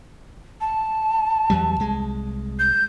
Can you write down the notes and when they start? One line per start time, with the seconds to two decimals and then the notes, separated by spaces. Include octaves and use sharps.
0.61 A5
1.50 E2 F#3 G3
1.80 C2 G#3
2.59 G6